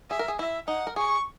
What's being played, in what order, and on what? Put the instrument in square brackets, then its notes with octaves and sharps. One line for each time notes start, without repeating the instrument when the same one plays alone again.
[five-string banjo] G#4 [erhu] E5
[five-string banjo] A#4
G#4
[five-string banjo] E4 [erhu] E5
[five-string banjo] D#4 [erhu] F#5
[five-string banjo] A#4
[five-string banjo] G#4 [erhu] C#6